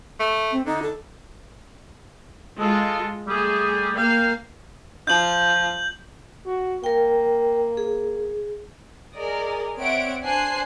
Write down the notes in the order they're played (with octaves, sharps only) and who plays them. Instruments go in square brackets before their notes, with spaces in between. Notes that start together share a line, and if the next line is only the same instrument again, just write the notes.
[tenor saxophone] A3
[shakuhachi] C4
[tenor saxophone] D3 [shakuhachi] D#4
[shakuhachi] A4
[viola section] G#3 F4 [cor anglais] A4
[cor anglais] G3 [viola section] A3 G#4
[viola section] A#3 F5 [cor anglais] G5
[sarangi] F3 [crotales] G6 F#7
[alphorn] F#4
[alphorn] A#3 [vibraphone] A#4 G5
[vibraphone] G#4
[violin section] G#4 A#4 D5 D#5
C4 C#5 D5 E5 F#5 D7
D4 C5 G#5 F#6 C7